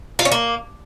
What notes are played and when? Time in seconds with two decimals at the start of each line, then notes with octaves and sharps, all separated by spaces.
0.19 F4
0.25 C#4
0.32 A#3